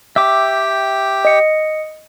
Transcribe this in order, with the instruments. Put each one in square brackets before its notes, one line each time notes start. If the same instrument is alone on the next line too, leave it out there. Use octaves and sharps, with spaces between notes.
[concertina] G4 G5 [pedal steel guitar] E5 D6
[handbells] D#5 C#7